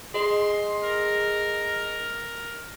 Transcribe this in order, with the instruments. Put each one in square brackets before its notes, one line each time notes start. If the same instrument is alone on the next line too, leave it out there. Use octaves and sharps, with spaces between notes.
[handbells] G#4 D#5 [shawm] C6
[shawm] A#4